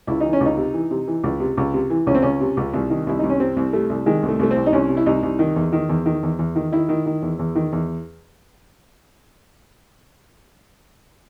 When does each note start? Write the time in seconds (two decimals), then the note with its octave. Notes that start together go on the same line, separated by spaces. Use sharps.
0.07 C#2 E4
0.21 E3 D#4
0.33 C#4
0.41 C#2
0.46 D#4
0.57 C3
0.74 E3
0.91 C3
1.08 E3
1.24 C#2
1.40 C3
1.57 C#2
1.74 C3
1.90 E3
2.07 C#2 C#4
2.15 C4
2.22 C#2 C#4
2.40 C3
2.57 C#2
2.74 C2
2.90 D#3
3.07 C2 E4
3.19 C2 D#4
3.30 C#4
3.40 C3 C4
3.57 C2
3.73 C3 A3
3.90 C2
4.06 D#3 G#3
4.23 C2
4.29 A3
4.39 C2 A3
4.51 C4
4.56 C2
4.66 D#4
4.73 C2 C#4
4.89 C3
4.97 E4
5.06 C2 D#4
5.23 C2
5.39 D#3
5.56 E2
5.73 D#3
5.89 E2
6.06 D#3
6.23 E2
6.39 E2
6.56 D#3
6.72 D#3 E4
6.89 D#3
7.06 D#3
7.22 E2
7.39 E2
7.55 D#3
7.72 E2